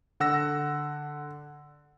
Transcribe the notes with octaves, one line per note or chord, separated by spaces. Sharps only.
D3 F#5 E6 A#6